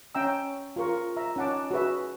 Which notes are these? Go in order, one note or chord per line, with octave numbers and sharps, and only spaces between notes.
C#4 E5 G5 A#5 E6
F4 G#4 A#4 C#6
E5 A#5
C#4 D#4 F#5 A5 D6
F#4 G#4 B4 E5